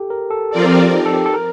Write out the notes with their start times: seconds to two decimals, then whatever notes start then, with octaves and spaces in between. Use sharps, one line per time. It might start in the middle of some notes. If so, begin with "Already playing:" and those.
Already playing: G4 A4
0.10 A#4
0.30 A4
0.51 F3 C4 F4 A4 A#4 D5
0.72 G4
0.93 D#4
1.06 A4
1.13 G4
1.26 A4
1.34 A#4